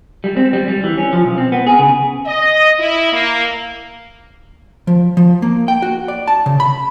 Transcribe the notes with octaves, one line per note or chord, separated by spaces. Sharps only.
G3
C4
G3
G3
E3
C#4
F3
B1
C4
B3
G#4
C#3
D#5
E4
A#3
F3
F3
A#3
G5
F#4
D5
A5
C#3
B5